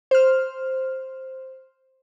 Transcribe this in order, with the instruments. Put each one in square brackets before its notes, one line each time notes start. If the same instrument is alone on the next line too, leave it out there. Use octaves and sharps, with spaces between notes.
[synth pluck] C5 F6